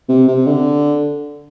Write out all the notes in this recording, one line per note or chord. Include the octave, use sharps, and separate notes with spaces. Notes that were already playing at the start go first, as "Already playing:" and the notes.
C3
C3
D3